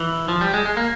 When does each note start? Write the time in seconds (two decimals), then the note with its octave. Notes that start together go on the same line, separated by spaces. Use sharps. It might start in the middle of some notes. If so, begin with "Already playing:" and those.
Already playing: E3
0.28 F3
0.41 G3
0.54 G#3
0.66 G#3
0.77 A#3